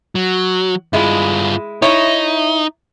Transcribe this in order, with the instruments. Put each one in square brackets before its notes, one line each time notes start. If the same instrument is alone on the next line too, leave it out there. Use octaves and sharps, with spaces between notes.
[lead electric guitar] F#3
[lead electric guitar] G2 F4 [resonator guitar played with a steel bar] G#3 E4
[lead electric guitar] D#4 [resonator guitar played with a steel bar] E4 C#5